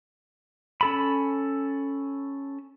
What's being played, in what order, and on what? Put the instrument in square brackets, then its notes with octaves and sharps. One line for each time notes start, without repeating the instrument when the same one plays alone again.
[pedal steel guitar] C#4 A4 B5